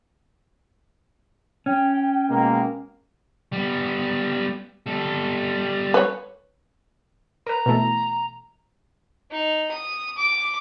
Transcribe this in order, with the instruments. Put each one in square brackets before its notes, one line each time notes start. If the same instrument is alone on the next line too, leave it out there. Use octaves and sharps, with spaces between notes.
[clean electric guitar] C#4 [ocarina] G5
[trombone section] B2 G#3 A#3
[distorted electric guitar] G3 B3
G3 A4
[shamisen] B4 C#5
[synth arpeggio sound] A#4 B4 [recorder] A#5
[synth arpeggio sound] B2 E3 A3
[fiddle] D#4
D#6
D6